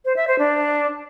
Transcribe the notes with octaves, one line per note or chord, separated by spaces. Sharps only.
C5
E5
C5
D4